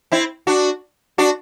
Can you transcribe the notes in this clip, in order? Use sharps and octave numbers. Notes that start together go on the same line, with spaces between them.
C4 E4
D4 F#4
D4 F#4